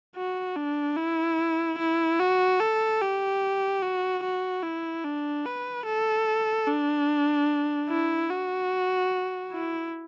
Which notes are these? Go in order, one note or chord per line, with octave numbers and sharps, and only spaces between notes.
F#4
D4
E4
E4
F#4
A4
G4
F#4
F#4
E4
D4
B4
A4
D4
E4
F#4
E4